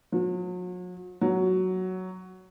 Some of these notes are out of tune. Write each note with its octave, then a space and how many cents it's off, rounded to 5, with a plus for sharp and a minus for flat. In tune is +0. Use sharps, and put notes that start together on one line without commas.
F#3 -40
F#3 +5